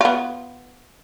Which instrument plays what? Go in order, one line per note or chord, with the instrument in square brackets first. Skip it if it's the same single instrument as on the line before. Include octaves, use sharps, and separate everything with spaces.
[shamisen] B3 F4